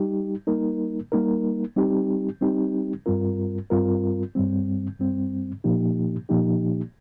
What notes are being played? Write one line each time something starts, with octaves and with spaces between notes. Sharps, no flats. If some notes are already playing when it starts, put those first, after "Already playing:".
Already playing: G3 D#4 G4
G3 A#3 D#4 A#4
G3 A#3 D#4 A#4
G3 C4 D#4 G4
G3 C4 D#4 G4
G2 G3 C4 F4 A#4
G2 G3 C4 F4 A#4
G2 G3 C4
G2 G3 C4
A#2 F3 A#3 D#4 G4
A#2 F3 A#3 D#4 G4